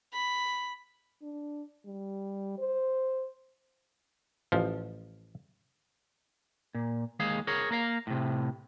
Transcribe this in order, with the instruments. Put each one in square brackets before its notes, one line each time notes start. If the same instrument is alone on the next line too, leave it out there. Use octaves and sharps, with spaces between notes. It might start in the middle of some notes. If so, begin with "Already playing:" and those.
[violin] B5
[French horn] D4
G3
C5
[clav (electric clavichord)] A1 F3
[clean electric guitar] A#2
D#2 G#3 G#4 F5
G#4 A#4 C#5
A#3 A#4 F5
A2 C3